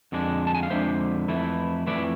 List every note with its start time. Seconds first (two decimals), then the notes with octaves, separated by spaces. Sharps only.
0.12 F2 D3 G#3 D4
0.47 A5
0.55 G#5
0.63 F5
0.70 F2 D3 G#3 D4 C5 E5
1.28 F2 E3 A3 E4
1.86 F2 E3 A3 E4 B4 D5